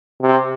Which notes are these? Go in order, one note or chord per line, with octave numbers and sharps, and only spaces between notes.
C3